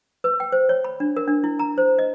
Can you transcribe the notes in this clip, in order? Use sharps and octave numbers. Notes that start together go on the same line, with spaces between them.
B4
G5
C5
C#5
B5
D4
A#4
D4
E4
A#5
C5
D#5